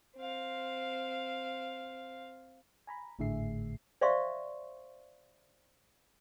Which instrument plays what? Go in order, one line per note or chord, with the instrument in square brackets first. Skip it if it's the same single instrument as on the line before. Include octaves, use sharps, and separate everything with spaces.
[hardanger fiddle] C4 F5
[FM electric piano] G#5 A#5 B5
G#1 A2 D3 G#4 E5 C7
[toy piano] C5 D5 E5 F5 C6 C#6